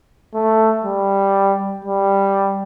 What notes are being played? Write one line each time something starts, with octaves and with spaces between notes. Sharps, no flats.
A3
G3
G3